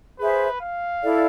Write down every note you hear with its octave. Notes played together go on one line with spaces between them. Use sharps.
G#4 B4 C5 E5
F5
E4 A4 D5